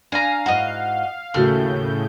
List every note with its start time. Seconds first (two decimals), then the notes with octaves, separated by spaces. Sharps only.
0.12 D4 F5 G#5 A#5
0.46 G#2 E4 F#4 D#5
1.34 D#2 A2 C#3 A3 F#4 E5 F6 G6